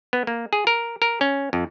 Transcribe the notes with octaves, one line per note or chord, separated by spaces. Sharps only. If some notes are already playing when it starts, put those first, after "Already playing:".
B3
A#3
G#4
A#4
A#4
C#4
F2